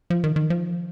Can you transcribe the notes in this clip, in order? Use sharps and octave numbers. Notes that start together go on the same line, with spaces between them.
F3
D#3
D#3
F3